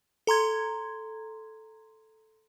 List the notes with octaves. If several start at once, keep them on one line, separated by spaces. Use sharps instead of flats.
A4 A#5 C6 G#6